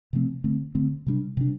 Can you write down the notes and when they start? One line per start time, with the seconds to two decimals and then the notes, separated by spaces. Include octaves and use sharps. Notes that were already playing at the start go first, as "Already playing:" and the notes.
0.13 C3 F3 A3 C4
0.44 D3 A3 C4
0.75 D3 A3 C4
1.07 C3 G3 D4
1.37 C3 G3 D4